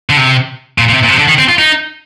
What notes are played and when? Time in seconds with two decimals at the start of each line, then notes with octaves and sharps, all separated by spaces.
0.10 D3
0.17 C3
0.78 A#2
0.89 A#2
0.94 C3
1.03 A#2
1.09 C3
1.18 D3
1.28 D#3
1.39 C4
1.49 F4
1.59 D#4